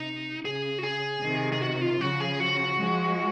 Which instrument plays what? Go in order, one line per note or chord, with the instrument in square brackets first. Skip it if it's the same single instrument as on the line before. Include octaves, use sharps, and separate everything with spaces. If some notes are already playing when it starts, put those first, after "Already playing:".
Already playing: [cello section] C3 [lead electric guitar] D#4
[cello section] C#3 [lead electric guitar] G#4
[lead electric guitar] F#4
G#4
[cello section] C3 D#3
[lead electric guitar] G#4
F#4
F4
[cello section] C#3 F3 [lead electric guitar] F#4
[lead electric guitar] G#4
F#4
[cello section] F3 G#3